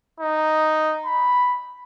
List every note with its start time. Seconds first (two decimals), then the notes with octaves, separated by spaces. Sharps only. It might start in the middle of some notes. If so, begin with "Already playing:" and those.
0.20 D#4
1.06 B5